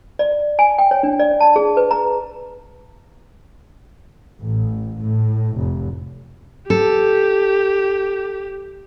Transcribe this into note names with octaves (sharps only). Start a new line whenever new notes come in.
D5
G#5
G5
C#5
D4
D5
A5
G#4
B4
A#5
A1
A2
F1
G4 A4